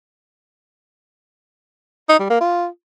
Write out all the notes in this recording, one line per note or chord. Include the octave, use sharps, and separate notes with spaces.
D#4
G3
A#3
F4